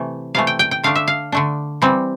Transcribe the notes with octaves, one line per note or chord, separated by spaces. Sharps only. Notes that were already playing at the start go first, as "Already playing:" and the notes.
Already playing: C3 E3 A3
C3 E3 A3 F5
G5
G5
G5
D3 A3 D4 F5
E5
F5
D3 A3 D4
E3 G3 C4